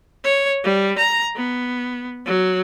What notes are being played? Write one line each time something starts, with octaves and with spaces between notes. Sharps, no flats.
C#5
G3
A#5
B3
F#3